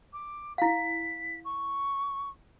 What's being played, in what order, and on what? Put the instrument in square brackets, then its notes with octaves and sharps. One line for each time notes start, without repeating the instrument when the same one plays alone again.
[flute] D6
[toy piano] E4 F5 [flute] B6
[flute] C#6